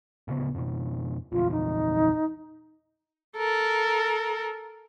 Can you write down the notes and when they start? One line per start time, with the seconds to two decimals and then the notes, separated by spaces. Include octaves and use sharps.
0.28 D1 C#3 B3
0.55 F2 B2
1.32 A#1 E2 F4
1.51 D#4
3.37 A4 A#4